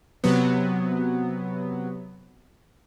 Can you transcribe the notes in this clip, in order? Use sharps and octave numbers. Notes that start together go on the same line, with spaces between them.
C3 F#3 B3